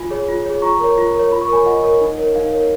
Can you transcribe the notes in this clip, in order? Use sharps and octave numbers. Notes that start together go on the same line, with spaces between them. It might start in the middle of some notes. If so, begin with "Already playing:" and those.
Already playing: F4 G#5 B5
G#4 C#5
F4
G#4 C#5
F4 A#5 C#6
A#4 C#5
F4
A#4 C#5
F4 B5
C#6
A#4 C#5 G#5 B5
F4 D#5 F#5
A#4 C#5
D#4
A#4 C#5
D#4 F5
A#4 C#5